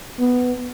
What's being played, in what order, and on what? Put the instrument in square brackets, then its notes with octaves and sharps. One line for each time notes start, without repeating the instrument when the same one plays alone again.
[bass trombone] B3